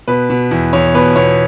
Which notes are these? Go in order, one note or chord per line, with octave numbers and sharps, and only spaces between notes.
B2 B4
B2
E2
E2 C#5
B2 B4
B2 C#5